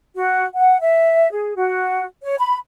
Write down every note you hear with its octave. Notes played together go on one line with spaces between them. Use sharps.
F#4
F#5
E5
G#4
F#4
C#5
B5